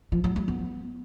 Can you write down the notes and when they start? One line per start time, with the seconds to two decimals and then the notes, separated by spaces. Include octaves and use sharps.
0.12 F3
0.24 F#3
0.36 G3
0.48 B3